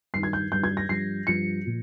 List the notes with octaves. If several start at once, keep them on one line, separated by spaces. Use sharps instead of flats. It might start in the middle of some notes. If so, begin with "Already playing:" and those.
G2 D#3 C7
G#6
G6
G2 D#3 G6
G#6
A#6
G2 F3 C7
G2 F3 C#7
A#2 F3